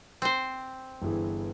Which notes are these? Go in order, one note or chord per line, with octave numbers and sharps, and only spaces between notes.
C4 C5
G1 E3 G#4